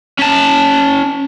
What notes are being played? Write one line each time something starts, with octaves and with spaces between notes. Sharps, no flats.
C#4 A5